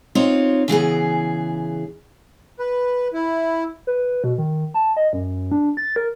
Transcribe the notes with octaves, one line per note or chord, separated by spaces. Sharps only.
C4 D#4 F4 C#5
C#3 E3 B3 G#4
B4
E4
B4
B2
D#3
A5
D#5
F#2
D4
A6
A#4